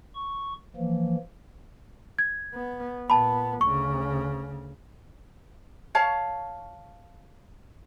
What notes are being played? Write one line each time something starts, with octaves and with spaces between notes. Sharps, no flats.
C#6
E3 F3 A#3
G#6
B3
A#2 B3 A5 B5
D2 C#3 C#6
C#5 F5 A5